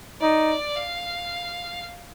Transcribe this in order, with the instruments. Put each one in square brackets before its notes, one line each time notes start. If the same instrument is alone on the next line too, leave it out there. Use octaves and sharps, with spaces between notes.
[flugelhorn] D#4 [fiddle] D5
[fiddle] F5